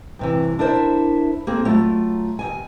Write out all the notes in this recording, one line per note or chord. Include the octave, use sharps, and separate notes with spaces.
G2 C3 E3
D4 E4 A#4 C5 D5 E5
A#3 C4 G#4 A4
F#3 A3 F4
D#2 G#2 G#5